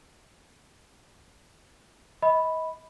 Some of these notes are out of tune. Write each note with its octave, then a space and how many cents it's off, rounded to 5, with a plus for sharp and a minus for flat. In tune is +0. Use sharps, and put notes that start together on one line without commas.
D#5 +35 B5 +0